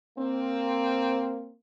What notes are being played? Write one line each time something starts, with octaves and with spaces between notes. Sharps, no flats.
A#3 C4